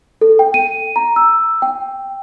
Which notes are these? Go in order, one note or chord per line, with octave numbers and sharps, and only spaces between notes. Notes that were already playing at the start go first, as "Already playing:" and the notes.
A4
G5
D#7
A#5
E6
G5